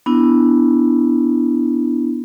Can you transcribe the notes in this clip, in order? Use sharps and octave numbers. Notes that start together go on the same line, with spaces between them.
B3 D4 E4